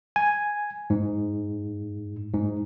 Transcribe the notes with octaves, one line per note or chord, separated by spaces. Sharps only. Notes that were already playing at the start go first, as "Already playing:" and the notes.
G#5
G#2
G#2